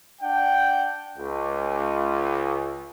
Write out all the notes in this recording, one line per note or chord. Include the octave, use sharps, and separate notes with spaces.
D4 F#5 G5
C#2